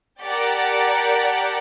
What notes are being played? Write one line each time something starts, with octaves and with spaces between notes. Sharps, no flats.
G4 A#4 D5 F#5 A5